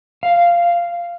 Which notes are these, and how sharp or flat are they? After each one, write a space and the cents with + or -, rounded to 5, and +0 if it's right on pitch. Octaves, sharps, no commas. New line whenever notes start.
F5 -10